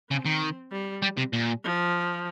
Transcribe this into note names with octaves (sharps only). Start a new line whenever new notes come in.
C#3 C4
D#3
G3
G3
C3
A#2
F3